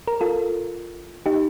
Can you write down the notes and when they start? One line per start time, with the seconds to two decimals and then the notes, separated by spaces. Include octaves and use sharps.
0.08 A#4
0.21 F4 A4
1.26 D#4 G4